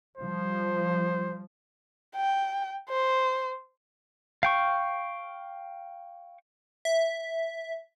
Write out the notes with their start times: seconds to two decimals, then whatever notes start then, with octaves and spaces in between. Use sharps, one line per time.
0.18 F3 G3 C5
2.15 G5
2.89 C5
4.43 F5 G5 C#6
6.85 E5